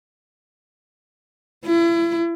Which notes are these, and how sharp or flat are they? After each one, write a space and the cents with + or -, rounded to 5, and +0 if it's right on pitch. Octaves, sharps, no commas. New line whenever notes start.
E4 +35